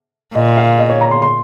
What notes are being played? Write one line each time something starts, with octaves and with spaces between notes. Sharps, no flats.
A#2 D#5
F5
D#5
C#5
A#5
C6
C6